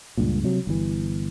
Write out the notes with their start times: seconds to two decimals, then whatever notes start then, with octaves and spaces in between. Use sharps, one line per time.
0.17 C#2 G2 A#2
0.44 C3 F#3
0.67 G1 E3